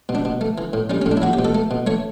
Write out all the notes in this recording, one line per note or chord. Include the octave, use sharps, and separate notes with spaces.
B2
D4
B2
A3
E3
A2
G3 C#4
A2 C#4
D4
E4
F#3 F#4
G4
B2
A4
A3
B2
A3 C#5